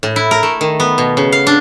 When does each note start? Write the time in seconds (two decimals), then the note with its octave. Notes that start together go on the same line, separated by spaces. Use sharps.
0.03 A2
0.16 E4
0.31 A#4
0.43 A3
0.61 D#3
0.80 B3
0.98 B2
1.17 C#3
1.32 F5
1.47 D4